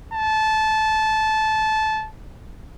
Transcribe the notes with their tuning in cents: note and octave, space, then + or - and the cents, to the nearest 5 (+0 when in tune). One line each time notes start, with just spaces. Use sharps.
A5 -15